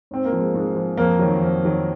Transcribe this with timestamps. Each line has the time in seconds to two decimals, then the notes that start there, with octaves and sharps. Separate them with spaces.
0.11 G#2 C4
0.25 A#3
0.32 F3
0.39 G#3
0.54 G#2 G#3
0.76 F3
0.97 F2 A#3
1.19 D#3 F#3
1.42 F2
1.63 D#3 F#3